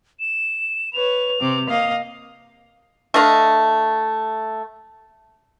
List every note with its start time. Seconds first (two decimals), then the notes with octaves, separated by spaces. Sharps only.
0.20 E7
0.93 B4 C#5 F7
1.41 C3 C4 D6
1.69 A#3 D#5 F5
3.14 A3 D4 D#5 F5